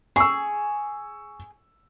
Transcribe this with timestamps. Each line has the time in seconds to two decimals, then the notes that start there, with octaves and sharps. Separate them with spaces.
0.16 G#4 C#6 E6